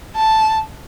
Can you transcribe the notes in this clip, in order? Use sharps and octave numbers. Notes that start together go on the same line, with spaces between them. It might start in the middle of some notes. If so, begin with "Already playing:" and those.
A5